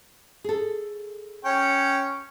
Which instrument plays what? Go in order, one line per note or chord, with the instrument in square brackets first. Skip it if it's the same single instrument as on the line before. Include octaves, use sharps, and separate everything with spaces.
[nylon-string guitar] G#4 A4
[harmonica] C#4 C#5 G5